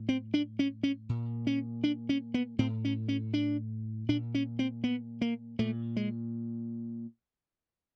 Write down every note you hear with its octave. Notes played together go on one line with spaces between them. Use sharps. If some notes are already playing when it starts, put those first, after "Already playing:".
Already playing: A2
C4
D4
C#4
C#4
A#2
C#4
D4
C#4
B3
A2 C4
C#4
C#4
D4
A#2 D4
C#4
C4
B3
A#3
A#2 A3
G#3